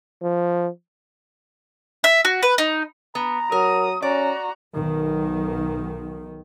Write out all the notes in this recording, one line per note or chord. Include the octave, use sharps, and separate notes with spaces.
F3
E5
F#4
B4
D#4
B3 A#5
F#3 A#4 D#6
C#4 F#4 D5 A#5
B1 D#3